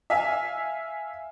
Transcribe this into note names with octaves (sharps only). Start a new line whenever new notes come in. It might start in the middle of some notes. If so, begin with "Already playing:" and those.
E5 F5 G#5